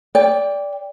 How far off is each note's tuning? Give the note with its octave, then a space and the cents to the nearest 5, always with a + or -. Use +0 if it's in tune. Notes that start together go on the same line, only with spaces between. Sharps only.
D5 -15 G5 +15